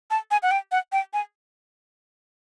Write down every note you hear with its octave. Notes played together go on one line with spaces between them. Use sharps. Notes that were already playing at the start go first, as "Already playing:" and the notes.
A5
G#5
F#5
G5
F#5
G5
G#5